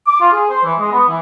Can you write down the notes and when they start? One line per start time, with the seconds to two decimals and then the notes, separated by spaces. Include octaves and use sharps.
0.07 D6
0.20 F4
0.32 G#4
0.49 C5
0.63 E3
0.79 G#3
0.92 B3
1.08 E3